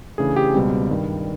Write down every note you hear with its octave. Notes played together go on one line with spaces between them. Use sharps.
C#3 E3 A3 D4 G#4
G4
C#2 B2 G3 C4
G2 D#3 G3